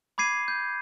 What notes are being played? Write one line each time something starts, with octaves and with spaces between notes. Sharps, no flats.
B5 D6 G#6 C7 D#7
G6